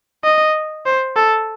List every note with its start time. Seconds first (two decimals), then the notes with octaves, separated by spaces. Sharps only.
0.24 D#5
0.86 C5
1.16 A4